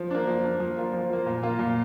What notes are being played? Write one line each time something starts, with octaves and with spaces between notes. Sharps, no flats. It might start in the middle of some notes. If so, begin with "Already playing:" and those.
Already playing: F3
A#3 D4
F3
A#3 D4
F3
A#3 F4
F3
A#3 F4
A#2
A#3 F4
A#2